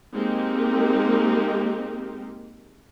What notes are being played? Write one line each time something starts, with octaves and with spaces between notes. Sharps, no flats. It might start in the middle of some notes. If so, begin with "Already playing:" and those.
G#3 A#3 C4 D#4 G4 A#4